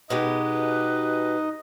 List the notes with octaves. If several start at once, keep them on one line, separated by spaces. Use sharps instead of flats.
B2 G#3 D#4 G4 B4 D#5